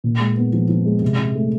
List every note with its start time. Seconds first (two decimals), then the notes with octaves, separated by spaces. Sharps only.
0.04 A#2
0.20 G#3
0.37 B3
0.53 F3
0.69 F3
0.85 G#3
1.02 C3
1.18 C3
1.35 A3